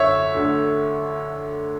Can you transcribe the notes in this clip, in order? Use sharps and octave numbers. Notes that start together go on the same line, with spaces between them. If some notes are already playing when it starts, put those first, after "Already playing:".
Already playing: F#2 D3 C#5 E5
D2 D3